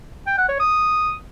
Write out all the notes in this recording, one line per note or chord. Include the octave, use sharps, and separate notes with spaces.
G5
F#5
C#5
D#6